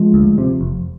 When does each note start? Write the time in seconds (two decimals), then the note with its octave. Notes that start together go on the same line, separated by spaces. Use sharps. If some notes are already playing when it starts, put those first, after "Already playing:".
Already playing: F3 G#3
0.14 D2
0.38 C3
0.61 F1